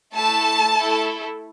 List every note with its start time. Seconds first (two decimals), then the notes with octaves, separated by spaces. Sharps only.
0.14 A3 E4 A4 A5
0.75 A3 E4 A4